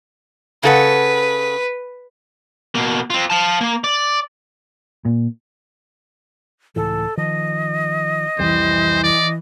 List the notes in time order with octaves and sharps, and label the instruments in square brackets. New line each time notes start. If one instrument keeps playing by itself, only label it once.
[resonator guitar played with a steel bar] C#3 A4 F#5 [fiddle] B4
[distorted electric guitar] B2 A#3
C4 F4
F5 A5
A#3
D5
[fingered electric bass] A#2
[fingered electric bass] C#2 A2 E3 [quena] A4
[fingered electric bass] D#3 F3 [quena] D#5
[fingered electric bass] C2 F2 G3 [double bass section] E3 [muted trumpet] C5
[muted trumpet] D5 [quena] D#5